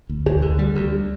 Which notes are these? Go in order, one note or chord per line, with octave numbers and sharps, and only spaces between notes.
D2
D2
D3
G3
D2